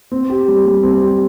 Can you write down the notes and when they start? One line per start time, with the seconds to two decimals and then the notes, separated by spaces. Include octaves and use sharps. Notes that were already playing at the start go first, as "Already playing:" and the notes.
0.12 C4
0.30 G4
0.48 G3
0.66 G3
0.83 C4
1.02 G4